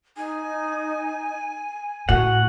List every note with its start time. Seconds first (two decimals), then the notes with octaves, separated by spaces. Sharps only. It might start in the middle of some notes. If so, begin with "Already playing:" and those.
0.17 D#4 G#5
2.09 A2 F#4 F#5